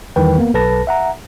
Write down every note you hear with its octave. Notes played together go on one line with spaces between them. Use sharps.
E2 D#3 E3 G3 B4 G5
A#3 B3
B1 A4 B4 A5 A#6
E5 F#5 A#5